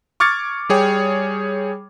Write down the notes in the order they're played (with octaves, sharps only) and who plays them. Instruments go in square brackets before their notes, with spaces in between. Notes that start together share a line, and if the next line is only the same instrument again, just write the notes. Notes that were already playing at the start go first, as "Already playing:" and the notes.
[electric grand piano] C#6 D6 F6 G#6 A6 C#7
G3 G#4 C#5 G5